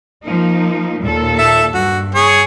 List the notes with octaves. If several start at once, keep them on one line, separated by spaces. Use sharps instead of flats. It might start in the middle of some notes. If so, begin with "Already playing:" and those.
F3 A#3 D#4
D#2 A#2 A4
E5 A5
G2 F#4
G#4 C#5